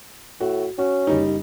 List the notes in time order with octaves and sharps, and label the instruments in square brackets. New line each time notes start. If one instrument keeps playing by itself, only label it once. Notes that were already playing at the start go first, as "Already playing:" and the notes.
[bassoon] A2 [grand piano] F#4
[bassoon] C#4 [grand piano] F#4
[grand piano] F#1 G3 D#4